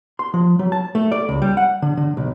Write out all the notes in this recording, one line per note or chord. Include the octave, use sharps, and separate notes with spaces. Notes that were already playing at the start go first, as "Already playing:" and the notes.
C6
F3
F#3
A5
A3
D5
C#2
G3
F#5
D3
D3
B1